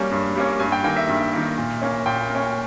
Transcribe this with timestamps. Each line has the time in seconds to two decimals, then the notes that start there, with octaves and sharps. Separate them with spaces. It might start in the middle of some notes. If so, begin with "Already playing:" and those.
Already playing: G3 A#3 C#4
0.11 G2
0.35 G3 A#3 C#4
0.59 G2 G#5
0.72 G5
0.84 D#3 A#3 G5
0.96 E5
1.08 G2
1.33 D#3 A#3
1.58 A#2
1.82 A#3 C#4
2.06 A#2 G5
2.30 A#3 C#4